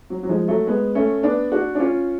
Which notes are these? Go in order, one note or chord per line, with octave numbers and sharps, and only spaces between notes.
F#3
F#3
F3 G#3
F#3 A3
G#3 B3
A3 C#4
B3 D4
D4 F#4
D4
C#4 F4